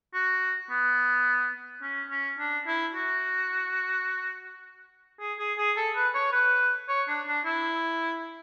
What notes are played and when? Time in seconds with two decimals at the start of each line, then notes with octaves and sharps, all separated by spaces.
0.14 F#4
0.70 B3
1.82 C#4
2.10 C#4
2.39 D4
2.67 E4
2.94 F#4
5.20 G#4
5.39 G#4
5.58 G#4
5.76 A4
5.96 B4
6.15 C#5
6.32 B4
6.89 C#5
7.08 D4
7.27 D4
7.45 E4